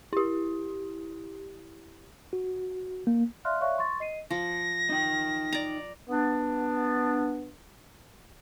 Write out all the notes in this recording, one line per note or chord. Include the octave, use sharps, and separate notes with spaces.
E4 G4
F#4
A#3
D5 E5 F5 C6 F6 F#6
C#5 D5 E5 F5 C#6 F#6
C6 C#6 A6
D#5 C7 D#7
F3 A#6
D#4 G5
D5 A#5
B3 D4